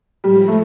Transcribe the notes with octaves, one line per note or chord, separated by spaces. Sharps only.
A2 F3 G3 G#3
A3